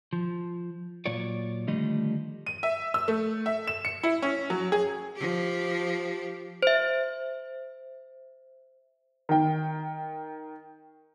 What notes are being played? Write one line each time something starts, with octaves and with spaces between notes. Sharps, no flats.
F3
A#2 F#3 F4 C#5 D5
D3 D#3 F3 G3 A3 D#5
D#7
E5
E6
A3
E5
E7
C#7
E4
C#4
F#3
G#4
F3 G4
C5 E5
D#3 G5